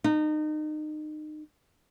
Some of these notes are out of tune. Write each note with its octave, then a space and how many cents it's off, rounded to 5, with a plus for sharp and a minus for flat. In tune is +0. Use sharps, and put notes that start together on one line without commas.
D#4 -30